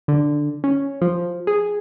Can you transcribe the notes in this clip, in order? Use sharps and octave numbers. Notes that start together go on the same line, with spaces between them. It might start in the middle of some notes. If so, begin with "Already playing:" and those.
D3
C#4
F3
G#4